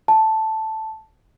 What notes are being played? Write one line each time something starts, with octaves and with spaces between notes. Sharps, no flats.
A5